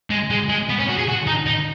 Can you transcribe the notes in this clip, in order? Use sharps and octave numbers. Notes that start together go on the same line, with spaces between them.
G#3
G#3
G#3
B3
C#4
F#4
G#4
F#4
D#4
D#4